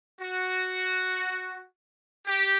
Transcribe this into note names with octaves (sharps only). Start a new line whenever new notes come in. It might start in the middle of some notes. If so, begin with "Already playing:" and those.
F#4
G4